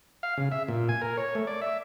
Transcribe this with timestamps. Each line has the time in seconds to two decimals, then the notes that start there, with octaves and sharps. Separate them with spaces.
0.23 F5
0.37 C#3
0.52 E5
0.68 A#2
0.89 G#5
1.02 A#4
1.17 C#5
1.35 A3
1.47 D5
1.62 E5